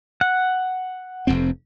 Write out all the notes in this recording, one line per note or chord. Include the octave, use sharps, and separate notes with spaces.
F#5
F1 F2 C4